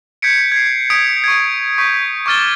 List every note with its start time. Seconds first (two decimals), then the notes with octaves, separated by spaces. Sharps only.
0.22 G6 G#6 B6 C#7 D7
0.52 G#6 C7
0.90 D#6 G#6 B6 D7
1.24 C#6 G#6
1.78 C#6 D#6 G6 B6
2.26 C#6 D6 F6 A6 G7